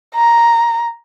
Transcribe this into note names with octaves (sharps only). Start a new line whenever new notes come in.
A#5